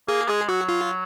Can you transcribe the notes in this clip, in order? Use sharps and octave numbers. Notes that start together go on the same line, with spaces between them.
A#3 G#4
G#3 G#4
F#3 F#4
F4